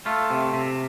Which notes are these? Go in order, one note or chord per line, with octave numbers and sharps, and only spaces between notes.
A3 F4
C3
C3